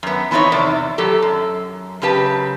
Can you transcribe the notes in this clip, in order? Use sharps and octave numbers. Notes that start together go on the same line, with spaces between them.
F#2 B3
E3 B3 C4 D4 D#4 C#5
E2 C3 D5
A2 F#3 G4 A4
F#2
F#2 C#3 G4 B4 A5